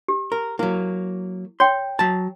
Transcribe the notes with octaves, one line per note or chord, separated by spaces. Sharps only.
G4
A#4
F#3 A#3 E4
C#5 G5 C6
F#3 A5